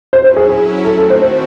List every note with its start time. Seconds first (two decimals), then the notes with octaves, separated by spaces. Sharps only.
0.13 F#3 C#4 E4 C5
0.24 C5
0.36 G#4
0.49 G#4
0.85 D#3 A3 C4 F#4 A4
0.97 A4
1.10 C5
1.22 C5